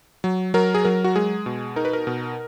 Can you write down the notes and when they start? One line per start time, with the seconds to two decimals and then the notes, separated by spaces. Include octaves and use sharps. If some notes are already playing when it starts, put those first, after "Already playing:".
0.24 F#3
0.54 F#3 A#4
0.74 G#4
0.84 F#3 A#4
1.04 F#4
1.16 G#3 G#4
1.46 B2
1.76 D#4 A#4
1.85 B4
1.93 A#4
2.07 B2